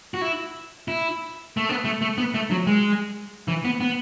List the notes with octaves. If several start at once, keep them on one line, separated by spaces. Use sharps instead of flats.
F#4
E4
E4
A3
B3
A3
A3
B3
A3
F#3
G#3
E3
B3
B3